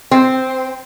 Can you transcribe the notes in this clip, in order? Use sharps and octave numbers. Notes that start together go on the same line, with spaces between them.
C4